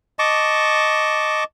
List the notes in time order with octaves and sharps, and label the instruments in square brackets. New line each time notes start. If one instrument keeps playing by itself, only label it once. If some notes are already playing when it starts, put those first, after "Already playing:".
[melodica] D#5 A5 C#6 D6